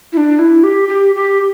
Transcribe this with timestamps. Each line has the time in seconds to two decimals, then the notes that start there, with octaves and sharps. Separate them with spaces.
0.13 E4
0.17 D4
0.39 E4
0.63 G4
0.89 G4
1.15 G4